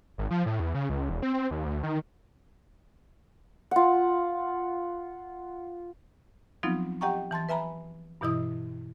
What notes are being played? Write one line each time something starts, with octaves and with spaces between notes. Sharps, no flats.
G#1
F3
A2
E2
C#3
C#2
E1
C4
C4
D#2
D2
D#3
F4 F#5
F3 F#3 B3 C4 D#4 F4
G4 D#5 F#5 G5 A#5 C#6
E3 A5 C6 A6
B4 E5 G#5 A#5 B5
G2 B2 E3 E4 D#5 D#6